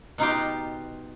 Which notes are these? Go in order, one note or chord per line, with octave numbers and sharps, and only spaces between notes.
B2 D#4 F4 G4